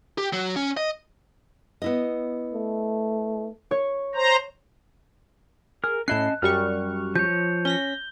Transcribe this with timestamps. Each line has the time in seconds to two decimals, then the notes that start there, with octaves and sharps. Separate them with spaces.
0.18 G4
0.33 F#3
0.56 C#4
0.77 D#5
1.82 B3 E4 D#5
2.54 A3
3.71 C#5 C#6
4.15 C5 A#5
5.84 G#4 A#4 F6
6.08 A2 C#4 E4 D#5 A5 F#6 C7
6.42 F#2 G3 C#6 F6
7.16 F3 C#5 G6
7.65 C#4 A#6 B6 G7